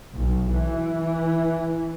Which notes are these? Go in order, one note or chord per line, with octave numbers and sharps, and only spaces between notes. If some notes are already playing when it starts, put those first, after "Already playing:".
B1
E3